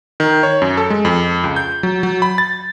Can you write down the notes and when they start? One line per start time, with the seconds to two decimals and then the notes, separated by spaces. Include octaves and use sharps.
0.20 D#3
0.43 C#5
0.62 F#2
0.77 A4
0.90 G#3
1.05 F2
1.44 C#2
1.56 G6
1.83 F#3
2.03 F#3
2.22 B5
2.38 A6